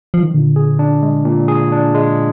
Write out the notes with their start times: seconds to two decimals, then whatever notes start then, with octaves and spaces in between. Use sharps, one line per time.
0.14 F3
0.23 D#3
0.33 A#2 D3
0.56 G#4
0.79 D4
1.02 G#3
1.25 A#2
1.48 G#4
1.72 D4
1.94 G#3